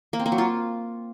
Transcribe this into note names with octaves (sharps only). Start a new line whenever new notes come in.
A#3
C4
A#3
F#3
F4